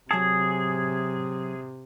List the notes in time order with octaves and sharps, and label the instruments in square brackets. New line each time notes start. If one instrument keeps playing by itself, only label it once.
[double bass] C3 [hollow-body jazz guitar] F#3 A5 [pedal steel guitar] G#4